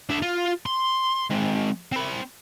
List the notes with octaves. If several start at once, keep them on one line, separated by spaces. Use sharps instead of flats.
D4 E5
F4
C6
G#3 C4
C4 B5